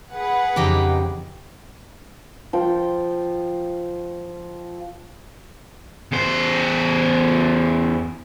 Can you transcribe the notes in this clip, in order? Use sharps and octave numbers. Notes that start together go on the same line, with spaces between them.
G#4 B4 F#5
F2 C#3 D#4 G4 D6
F3 G5
E2 C5